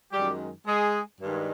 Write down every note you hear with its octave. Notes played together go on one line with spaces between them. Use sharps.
F#2 D#3 G3 G#3 G4
G#3 G#4
G2 D#3 G#3